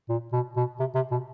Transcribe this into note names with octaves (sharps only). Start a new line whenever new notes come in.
A#2
B2
B2
C3
C3
B2